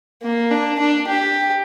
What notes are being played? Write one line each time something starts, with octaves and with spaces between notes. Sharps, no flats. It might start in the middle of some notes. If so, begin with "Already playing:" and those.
A#3
D4
D4
G4